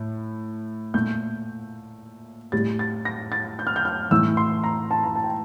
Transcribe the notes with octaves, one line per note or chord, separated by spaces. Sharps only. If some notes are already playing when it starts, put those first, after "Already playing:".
Already playing: A2
A#2 A3 G6
A2 G3 A6
A6
A#6
A6
G6
F6
G6
F6
A2 E3 A3 E6
C6
A#5
A5
A#5
A5
G5